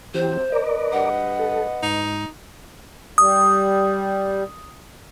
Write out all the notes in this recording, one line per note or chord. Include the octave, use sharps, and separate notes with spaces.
C3 E3 F#3 C4 G4 C5
D2 A#4 B4 D5 D#5
G2 F#5
A4
G#2 D#4
G3 D#6